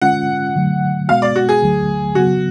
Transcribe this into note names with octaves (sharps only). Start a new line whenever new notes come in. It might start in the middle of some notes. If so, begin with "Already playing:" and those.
D3 G#3 C#4 F4 F#5
D3 F#3 A3
B2 G#3 B3 F#4 F5
D5
F#4
G#4
D2 D3 F#3 A3
C#3 F#3 B3 F#4